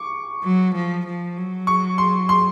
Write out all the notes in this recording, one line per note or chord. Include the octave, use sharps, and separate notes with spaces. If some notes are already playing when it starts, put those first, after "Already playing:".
Already playing: C#6 D6
F#3
F3
F3
F#3
C#6
C6
C6